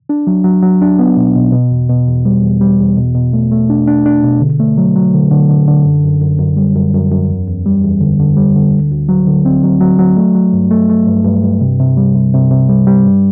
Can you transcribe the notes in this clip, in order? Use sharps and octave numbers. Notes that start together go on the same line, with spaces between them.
D4
F#3
F#3
F#3
D4
B3
B2
B2
B2
E2
B2
E2
G3
E2
G3
E2
B2
B2
A3
A3
D4
D4
D4
B2
D3
A3
F#3
F#3
D3
D3
D3
D3
F#2
F#2
F#2
F#2
G3
F#2
F#2
F#2
E2
E2
G3
E2
D3
D3
G3
D3
D2
D2
F#3
D3
C4
F#3
F#3
F#3
A3
F#3
G2
A3
A3
G2
G2
G2
C3
C3
G3
C3
C3
C3
G3
G3
G2